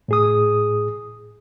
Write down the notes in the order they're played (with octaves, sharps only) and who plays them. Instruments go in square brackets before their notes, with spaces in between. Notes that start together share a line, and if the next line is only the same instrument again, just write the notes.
[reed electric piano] A2 G#4 D#6